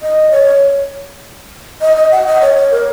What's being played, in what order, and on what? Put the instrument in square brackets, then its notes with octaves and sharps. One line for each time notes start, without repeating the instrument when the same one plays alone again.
[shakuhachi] D#5
C#5
D#5
D#5
F#5
D#5
C#5
C#5
A#4